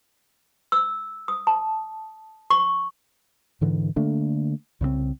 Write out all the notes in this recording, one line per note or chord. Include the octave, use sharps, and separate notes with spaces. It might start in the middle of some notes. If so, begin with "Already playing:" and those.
E6
D#6
A5
C#6
G#2 D3 E3
D3 A3 A#3 D4
C2 C#3 G#3 C4